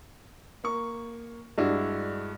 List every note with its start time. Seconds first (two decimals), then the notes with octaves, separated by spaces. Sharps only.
0.64 A#3 C#6
1.58 G2 G#3 D4 E4 F#4